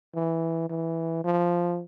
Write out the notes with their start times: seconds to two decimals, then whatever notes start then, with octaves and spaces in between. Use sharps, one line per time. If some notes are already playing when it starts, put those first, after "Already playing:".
0.15 E3
0.70 E3
1.25 F3